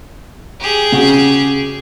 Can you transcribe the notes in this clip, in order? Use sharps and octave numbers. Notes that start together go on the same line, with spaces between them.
G4 G#4
C#3 F#4